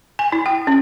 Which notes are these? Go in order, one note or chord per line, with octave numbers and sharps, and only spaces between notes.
G#5
E4
G5
C#4